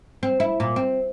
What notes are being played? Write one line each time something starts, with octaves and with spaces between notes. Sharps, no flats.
C4
E4
A#2
C4